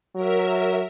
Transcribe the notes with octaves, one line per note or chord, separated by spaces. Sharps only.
F#3 A#4 E5